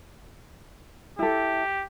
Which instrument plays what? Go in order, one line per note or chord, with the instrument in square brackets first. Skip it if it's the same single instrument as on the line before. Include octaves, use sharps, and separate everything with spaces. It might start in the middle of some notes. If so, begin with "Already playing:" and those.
[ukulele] E4 A4 [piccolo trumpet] G4